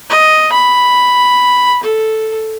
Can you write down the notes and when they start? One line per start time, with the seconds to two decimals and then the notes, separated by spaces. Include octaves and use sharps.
0.10 D#5
0.53 B5
1.83 A4